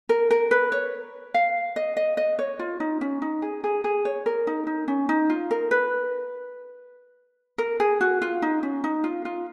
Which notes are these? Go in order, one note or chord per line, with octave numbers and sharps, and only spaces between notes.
A#4
A#4
B4
C#5
F5
D#5
D#5
D#5
C#5
F4
D#4
C#4
D#4
G#4
G#4
G#4
C#5
A#4
D#4
D#4
C#4
D#4
F4
A#4
B4
A#4
G#4
F#4
F4
D#4
C#4
D#4
F4
F4